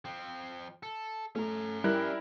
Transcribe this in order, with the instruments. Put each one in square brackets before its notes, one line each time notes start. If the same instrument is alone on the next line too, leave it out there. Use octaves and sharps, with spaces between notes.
[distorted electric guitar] F3 C4
A4
[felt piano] A3 [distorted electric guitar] C#4 A#5
[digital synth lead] G3 [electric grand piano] E4 A#4 [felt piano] F#6